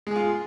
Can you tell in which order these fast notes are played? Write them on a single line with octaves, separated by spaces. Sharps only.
G#3 G#4 F4